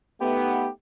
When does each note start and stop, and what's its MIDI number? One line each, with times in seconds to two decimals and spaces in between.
0.21 0.68 57
0.21 0.68 59
0.21 0.68 63
0.21 0.69 67